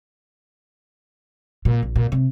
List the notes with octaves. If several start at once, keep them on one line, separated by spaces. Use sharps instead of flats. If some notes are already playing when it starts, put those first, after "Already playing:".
A#2
A#1
A#2
C3